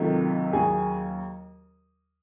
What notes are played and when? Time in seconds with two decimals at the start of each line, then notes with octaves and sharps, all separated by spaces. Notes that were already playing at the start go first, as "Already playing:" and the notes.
Already playing: C#2 C3 D#3 F#3 A3
0.53 D#2 C#3 F#3 G#4 G#5